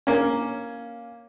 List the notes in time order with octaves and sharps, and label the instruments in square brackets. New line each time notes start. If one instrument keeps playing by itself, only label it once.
[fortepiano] A#3 C#4